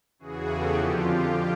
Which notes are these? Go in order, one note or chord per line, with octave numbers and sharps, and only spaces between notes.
E2 C#3 E3 F#4 G#4
G4 A4
F2 D3 F3 F4 G4